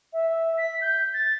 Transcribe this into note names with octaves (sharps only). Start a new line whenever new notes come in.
E5
B6
G6
A6